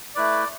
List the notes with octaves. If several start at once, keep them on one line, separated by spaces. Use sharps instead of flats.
A3 E4 B4 D5